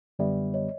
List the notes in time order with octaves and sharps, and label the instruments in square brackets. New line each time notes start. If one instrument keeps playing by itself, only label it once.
[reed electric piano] F#2 D3 G3 B3 [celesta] D5 E5
[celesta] C#5 D#5